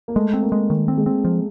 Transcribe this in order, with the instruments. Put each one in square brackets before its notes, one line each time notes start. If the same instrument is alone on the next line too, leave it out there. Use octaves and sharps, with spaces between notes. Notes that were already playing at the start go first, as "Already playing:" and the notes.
[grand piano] A#3
[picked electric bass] G#3 [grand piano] A3
[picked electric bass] C4
[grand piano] A#3
[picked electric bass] G#3
D#3
C4
[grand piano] G#3
[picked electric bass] C4
F3